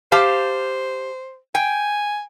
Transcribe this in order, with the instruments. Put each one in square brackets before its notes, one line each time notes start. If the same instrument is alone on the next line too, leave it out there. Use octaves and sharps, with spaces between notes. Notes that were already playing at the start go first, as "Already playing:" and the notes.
[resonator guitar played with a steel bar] G4 F5 A5 [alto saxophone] C5
[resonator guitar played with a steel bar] G5 [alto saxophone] G#5